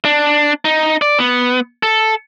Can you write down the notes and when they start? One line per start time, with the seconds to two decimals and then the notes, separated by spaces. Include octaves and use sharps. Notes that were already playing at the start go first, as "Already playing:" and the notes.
0.05 D4
0.65 D#4
1.01 D5
1.19 B3
1.83 A4